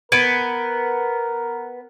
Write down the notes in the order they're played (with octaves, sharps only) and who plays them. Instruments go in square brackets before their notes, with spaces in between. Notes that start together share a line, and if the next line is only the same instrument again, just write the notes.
[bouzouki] B3 [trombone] A#4 [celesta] G#6 D7 D#7